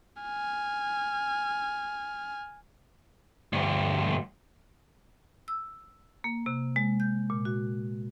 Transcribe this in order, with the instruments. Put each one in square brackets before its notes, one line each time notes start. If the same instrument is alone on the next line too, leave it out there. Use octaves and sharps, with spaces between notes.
[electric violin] G#5 F6
[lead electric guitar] D2 G2
[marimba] E6
A#3
C3
G#3
G6
A#2
F#4